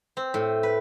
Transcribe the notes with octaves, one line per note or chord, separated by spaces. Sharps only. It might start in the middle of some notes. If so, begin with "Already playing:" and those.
C4
A2
B4